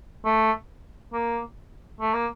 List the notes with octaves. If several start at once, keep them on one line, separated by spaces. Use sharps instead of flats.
A3
A#3
A3
A#3